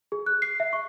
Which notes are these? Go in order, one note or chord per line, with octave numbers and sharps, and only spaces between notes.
G#4
F#6
C7
E5
C#6